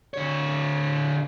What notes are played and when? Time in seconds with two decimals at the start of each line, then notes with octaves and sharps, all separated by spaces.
0.14 D3 C#5